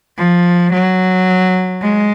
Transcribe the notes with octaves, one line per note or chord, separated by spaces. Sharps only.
F3
F#3
G#3